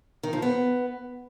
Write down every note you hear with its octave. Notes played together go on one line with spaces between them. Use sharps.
D#3
F3
B3